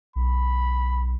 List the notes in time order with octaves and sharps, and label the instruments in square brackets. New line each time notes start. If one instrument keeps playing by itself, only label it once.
[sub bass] B1 [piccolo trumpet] B5